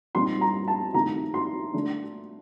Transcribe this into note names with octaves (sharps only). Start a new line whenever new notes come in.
A#2 G3 C4 D#4 C6
A#5
A5
C3 D#3 A3 A#5
C6
D3 A3 D4